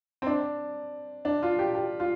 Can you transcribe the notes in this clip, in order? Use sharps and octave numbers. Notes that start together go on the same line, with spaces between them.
C4
D4
D4
F4
G4
G4
F4